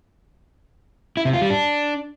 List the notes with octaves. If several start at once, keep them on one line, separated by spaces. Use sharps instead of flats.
E4
C3
F4
G3
D4